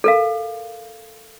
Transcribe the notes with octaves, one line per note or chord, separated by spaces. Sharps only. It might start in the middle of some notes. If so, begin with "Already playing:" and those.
A4 A#4 F5